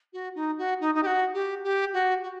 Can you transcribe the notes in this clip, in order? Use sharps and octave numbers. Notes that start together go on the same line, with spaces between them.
F#4
D#4
F#4
D#4
D#4
G4
F#4
G4
G4
F#4
F#4